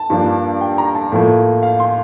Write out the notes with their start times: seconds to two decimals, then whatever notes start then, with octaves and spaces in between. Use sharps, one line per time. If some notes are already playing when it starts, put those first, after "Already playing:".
Already playing: A5
0.10 G2 F3 A#3 D4
0.61 G5
0.78 A#5
0.95 A5
1.12 A2 F3 A#3
1.63 F5
1.80 C6